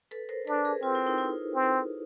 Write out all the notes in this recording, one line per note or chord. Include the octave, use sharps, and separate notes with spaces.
A4 B4
A#4 C5
D4 A4 B4
G#4 A#4
C4 F4
E4
D#4
E4
C4